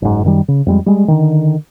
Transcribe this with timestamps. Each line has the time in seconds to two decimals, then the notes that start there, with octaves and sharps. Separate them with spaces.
0.02 F#1 G#2
0.24 F#2 D#3 G3
0.48 C#3
0.66 F2 G3 G#3
0.86 G3 G#3
1.08 D3 D#3